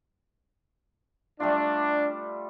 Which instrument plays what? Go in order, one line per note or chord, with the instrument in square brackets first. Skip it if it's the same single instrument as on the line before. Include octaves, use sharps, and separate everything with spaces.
[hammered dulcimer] G3 A3 F4 [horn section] D4